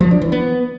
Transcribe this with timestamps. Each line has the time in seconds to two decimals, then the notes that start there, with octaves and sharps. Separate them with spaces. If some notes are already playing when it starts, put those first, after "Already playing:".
0.01 F3
0.11 D4
0.22 E3
0.32 B3